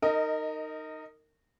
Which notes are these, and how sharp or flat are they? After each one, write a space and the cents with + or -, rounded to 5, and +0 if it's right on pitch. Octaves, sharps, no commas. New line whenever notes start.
D#4 -5 A#4 -25 D#5 +15